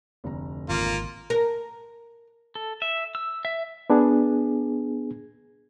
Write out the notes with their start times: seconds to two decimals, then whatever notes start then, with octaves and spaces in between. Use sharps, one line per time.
0.24 F1 D2 A#5
0.69 G#1 A#3 F4
1.30 A#4
2.55 A4
2.82 E5
3.15 E6
3.45 E5
3.90 B3 D4 G#4